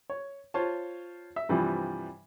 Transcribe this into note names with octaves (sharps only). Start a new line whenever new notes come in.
C#5
F4 C5 C#5 A5
E5
G2 C3 E3 F3 G3 E4